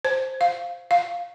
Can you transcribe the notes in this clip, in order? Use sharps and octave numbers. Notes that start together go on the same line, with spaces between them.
C5
F5
F5